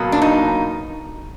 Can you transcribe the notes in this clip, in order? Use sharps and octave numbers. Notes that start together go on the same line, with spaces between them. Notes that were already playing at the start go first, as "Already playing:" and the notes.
Already playing: B2 F#3 A#3
D4
D#4